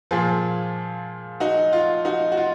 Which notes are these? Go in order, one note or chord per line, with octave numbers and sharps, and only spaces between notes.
A#2 F3 F4 G#4
D#4 F#4
F4
D#4 F#4
F#4
F4